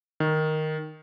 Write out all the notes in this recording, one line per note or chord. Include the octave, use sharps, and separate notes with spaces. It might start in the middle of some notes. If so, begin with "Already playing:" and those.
D#3